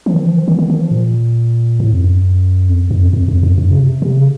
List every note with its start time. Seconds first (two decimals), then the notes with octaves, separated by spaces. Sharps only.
0.06 F3
0.14 D#3
0.26 F3
0.37 D#3
0.48 D#3
0.59 D#3
0.70 D#3
0.81 F3
0.91 A#2
1.80 A2
1.93 F2
2.03 F#2
2.69 F2
2.91 F#2
3.02 F2
3.13 F2
3.28 F2
3.43 F#2
3.58 F#2
3.71 C#3
3.79 C3
4.02 C3
4.17 C#3